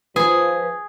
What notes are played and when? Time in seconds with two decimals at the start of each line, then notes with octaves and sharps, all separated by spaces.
0.16 F3 G#4 B4